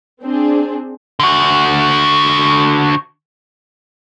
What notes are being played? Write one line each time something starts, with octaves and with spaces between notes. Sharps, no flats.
C4 D4 G#4
D3 F#4